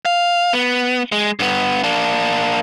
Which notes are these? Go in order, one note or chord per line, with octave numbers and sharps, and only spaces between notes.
F5
B3
G#3
G2 B3
A#3 D4